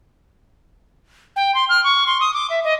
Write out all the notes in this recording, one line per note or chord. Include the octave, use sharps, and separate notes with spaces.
G5
C6
F6
C#6
C6
D#6
D6
E5
D#5